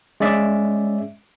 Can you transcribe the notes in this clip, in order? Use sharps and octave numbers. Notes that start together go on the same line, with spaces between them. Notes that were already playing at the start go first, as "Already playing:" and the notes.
G#3 C#4 D5 E5